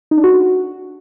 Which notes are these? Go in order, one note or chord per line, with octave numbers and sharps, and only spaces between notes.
D#4
D4
F#4